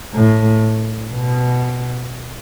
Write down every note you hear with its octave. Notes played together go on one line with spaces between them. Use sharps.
A2
B2